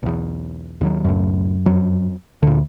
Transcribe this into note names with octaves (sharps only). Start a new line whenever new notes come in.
B1 E2
D#2 D#3 F#3
F#1 C#2 F#2 A2
F2 F#3
D2 A#2 D3